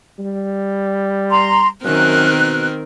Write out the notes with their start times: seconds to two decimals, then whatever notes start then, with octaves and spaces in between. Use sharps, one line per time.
0.19 G3
1.30 A#5 C6
1.85 F#2 D#3 C4 A#4 F#6
2.31 B2